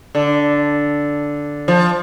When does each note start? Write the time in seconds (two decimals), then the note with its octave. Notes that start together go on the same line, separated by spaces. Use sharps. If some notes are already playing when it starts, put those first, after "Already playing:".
0.15 D3
1.68 F3